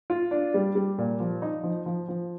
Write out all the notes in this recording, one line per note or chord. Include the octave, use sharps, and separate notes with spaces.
F4
D4
G3
G3
A#2
F3
D#4
F3
F3
F3